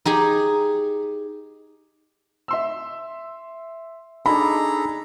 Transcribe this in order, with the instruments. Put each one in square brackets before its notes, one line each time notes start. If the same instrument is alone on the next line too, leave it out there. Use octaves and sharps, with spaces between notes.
[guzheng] D#4 G4 G#4
[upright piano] E5 C6 E6
[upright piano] D4 D#4 [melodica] G#4 A4 A#5 [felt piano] B5